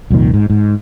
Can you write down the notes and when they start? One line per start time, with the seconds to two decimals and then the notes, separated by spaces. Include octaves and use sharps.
0.10 C2 F2 A#2 D#3
0.34 G#2
0.50 G#2